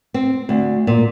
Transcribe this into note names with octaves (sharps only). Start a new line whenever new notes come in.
C4
D2
A#2